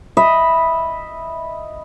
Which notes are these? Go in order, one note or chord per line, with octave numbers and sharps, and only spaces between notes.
D#5 E5 B5